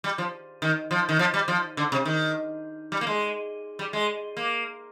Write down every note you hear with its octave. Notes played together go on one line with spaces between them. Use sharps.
G3
F3
D#3
F3
D#3
F3
G3
F3
D3
C3
D#3
G3
A#3
G#3
G3
G#3
A#3